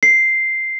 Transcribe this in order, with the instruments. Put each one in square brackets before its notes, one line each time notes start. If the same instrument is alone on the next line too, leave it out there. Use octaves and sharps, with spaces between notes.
[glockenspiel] C7